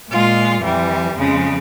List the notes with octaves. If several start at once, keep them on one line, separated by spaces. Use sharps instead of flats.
A#2 G#3 F4
F2 E3 G3
F2 C#3 F3 G#3